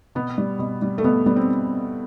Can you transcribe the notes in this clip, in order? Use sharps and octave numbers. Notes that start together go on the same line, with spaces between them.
B2 B3
G3
B2
G3
A3
B2 B3
G3 B3
C4